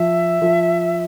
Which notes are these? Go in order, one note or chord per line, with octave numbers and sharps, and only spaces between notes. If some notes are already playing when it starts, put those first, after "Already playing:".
Already playing: F3 E5
F3